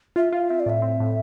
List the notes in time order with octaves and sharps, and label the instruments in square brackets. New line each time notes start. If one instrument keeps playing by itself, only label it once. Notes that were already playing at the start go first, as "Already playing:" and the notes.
[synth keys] F4 [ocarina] E5
[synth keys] F4 [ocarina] F5
[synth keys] C4 [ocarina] E5
[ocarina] D5
[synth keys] A2 [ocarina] E5
[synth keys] C4
A2